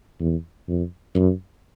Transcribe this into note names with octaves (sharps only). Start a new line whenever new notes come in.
E2
F2
F#2